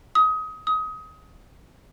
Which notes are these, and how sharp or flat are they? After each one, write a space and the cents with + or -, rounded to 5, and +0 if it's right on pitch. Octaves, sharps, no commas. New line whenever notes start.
D#6 +25
D#6 +25